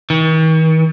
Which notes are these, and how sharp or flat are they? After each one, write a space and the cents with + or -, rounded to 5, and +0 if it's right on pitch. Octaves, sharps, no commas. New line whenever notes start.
D#3 +45